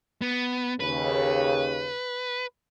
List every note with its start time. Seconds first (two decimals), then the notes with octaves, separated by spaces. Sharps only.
0.21 B3
0.80 D#2 C#3 B4